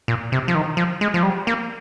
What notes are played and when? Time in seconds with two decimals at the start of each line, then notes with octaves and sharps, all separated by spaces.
0.08 A#2
0.32 C3
0.48 F3
0.55 D#3
0.77 F3
1.01 G#3
1.14 F3
1.23 G3
1.47 A#3